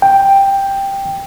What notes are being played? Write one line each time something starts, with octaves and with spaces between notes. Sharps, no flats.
G5